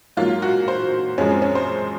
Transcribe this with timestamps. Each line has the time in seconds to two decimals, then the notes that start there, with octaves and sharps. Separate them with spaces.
0.17 G#2 F#3 A#3 F4
0.42 F#4
0.68 C5
1.18 F#2 F3 G#3 C#4
1.30 C4
1.42 C#4
1.55 C5